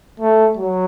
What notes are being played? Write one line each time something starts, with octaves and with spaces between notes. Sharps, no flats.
A3
F#3